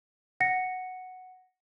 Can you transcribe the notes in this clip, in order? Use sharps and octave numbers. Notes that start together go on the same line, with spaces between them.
F#5 A#6 C#7